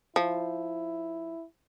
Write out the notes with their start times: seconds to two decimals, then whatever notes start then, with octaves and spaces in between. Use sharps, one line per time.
0.16 F3 E4